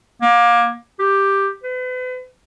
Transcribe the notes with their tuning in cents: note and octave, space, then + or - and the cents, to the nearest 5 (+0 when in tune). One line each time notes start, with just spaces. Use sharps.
A#3 +25
G4 +5
B4 +40